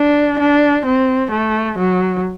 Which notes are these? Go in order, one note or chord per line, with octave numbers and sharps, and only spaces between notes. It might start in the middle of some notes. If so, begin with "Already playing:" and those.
Already playing: D4
D4
C4
A3
F#3